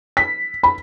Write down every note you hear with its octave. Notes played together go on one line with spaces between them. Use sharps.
B6
B5